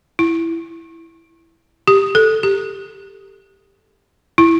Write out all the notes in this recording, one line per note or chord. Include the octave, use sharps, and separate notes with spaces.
E4
G4
A4
G4
E4